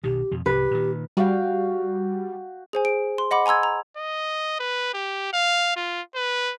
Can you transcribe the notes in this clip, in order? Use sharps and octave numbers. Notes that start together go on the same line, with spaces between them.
B1 B2 D#3 G4
F2 B2
C2 G#2 C3 G4 B4
A#2 D#3
G3 F#4 F5 G5
G#4 C5 G#5
G#4 D7
C6
D#5 F#5 B5 D6
G#5 A#5 C6 E6 G#6
A#5
D#5
B4
G4
F5
F4
B4